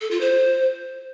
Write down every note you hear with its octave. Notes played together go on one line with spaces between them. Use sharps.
A4
F4
C5